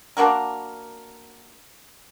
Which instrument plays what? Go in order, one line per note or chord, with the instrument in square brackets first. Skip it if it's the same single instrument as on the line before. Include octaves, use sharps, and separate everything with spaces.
[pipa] A#3 D4 F#4 A#4